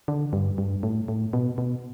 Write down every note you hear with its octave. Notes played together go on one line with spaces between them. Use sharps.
D3
G2
G2
A2
A2
B2
B2